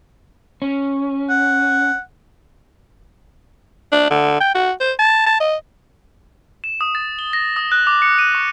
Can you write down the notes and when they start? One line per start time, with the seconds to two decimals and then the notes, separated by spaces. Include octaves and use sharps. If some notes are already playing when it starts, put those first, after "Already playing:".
0.62 C#4
1.29 F#5
3.92 D4
4.10 D3
4.40 G5
4.55 F#4
4.80 C5
4.99 A5
5.26 A5
5.40 D#5
6.64 E7
6.81 D#6
6.95 A6
7.19 G7
7.33 A#6
7.56 D#6
7.72 F#6
7.87 D6
8.02 C#7
8.19 D#7
8.35 C#6